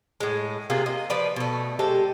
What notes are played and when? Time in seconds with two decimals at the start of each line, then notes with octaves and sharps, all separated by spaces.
0.20 A2 G#3
0.70 C3 A#3 F4 G#4
0.86 D#5
1.10 F3 B4 D5
1.36 B2 A3
1.79 G#3 C4 G4 A4